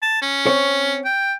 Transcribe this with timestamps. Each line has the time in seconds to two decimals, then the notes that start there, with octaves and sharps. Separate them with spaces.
0.02 A5
0.22 C#4
0.47 C4 C#5
1.05 G5